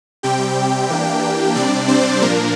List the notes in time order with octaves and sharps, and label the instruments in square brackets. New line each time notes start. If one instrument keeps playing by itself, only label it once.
[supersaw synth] C3 G3 C4 G4 G5
E3 A#3 D4
C3 G3 C4 D4 D5
C4 C5
A#2 F3 A#3 D4 A#4